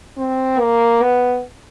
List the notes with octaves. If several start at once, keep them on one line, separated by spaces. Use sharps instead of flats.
C4
A#3
B3